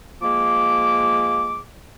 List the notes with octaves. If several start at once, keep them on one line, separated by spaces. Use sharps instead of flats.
F3 G#3 A#3 D6